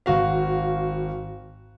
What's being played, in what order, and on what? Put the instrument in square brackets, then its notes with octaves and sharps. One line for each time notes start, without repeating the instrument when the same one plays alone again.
[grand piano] G#1 F#4 F5